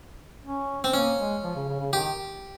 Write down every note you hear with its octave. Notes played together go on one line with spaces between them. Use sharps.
C#4
C4
A#3 C#4
G#3
F3
C#3
C#3
C#3
D#3 G4